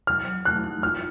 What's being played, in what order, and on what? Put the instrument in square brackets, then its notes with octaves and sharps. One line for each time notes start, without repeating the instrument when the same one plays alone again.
[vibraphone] F#3 [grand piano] F6
[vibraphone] F#3
[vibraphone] A3 [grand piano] F#6
[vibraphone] D#4
[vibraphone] F4 [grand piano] F6